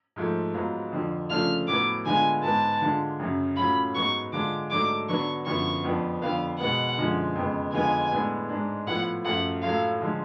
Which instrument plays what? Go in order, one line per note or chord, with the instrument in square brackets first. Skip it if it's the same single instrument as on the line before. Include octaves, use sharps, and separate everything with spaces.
[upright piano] G#2 F3 A3
G#2 F#3 B3 F4
F2 D3 F3
[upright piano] C#3 F3 A3 D4 F4 [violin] F6
[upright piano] A2 F#3 B3 [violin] D6
[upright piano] D3 G#3 B3 F4 [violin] G#5
[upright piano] G#2 G#3 B3 [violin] A5
[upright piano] D3 G#3 D4 F4
F#2 C#3 F#3
[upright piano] A2 F#3 C#4 F4 [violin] B5
[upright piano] G#2 F#3 B3 [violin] C#6
[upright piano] D3 G#3 D4 F4 [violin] D6
[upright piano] G#2 F#3 A3 D4 [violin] D6
[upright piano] D3 F#3 B3 D4 [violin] C#6
[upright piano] F#2 D3 F3 B3 [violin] C#6
[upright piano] F2 F3 B3 D4
[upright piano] F2 D3 F3 B3 [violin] F5
[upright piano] B2 G#3 B3 [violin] F#5
[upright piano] F#2 D3 F3 G#3
F2 C#3 G#3 B3
[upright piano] F2 D3 G#3 B3 F4 [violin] G#5
[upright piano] A2 G#3 B3 D4
G#2 G#3 D4
[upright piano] A2 F3 B3 F4 [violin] F#5
[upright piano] F#2 F3 A3 F4 [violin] F#5
[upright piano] A2 F#3 A3 F4 [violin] F5
[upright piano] D3 F3 G#3 D4 F4